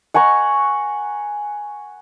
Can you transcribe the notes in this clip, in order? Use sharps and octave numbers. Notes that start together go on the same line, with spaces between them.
F#5 G#5 A#5 C#6